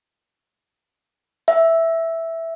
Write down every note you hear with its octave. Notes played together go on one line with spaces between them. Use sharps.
E5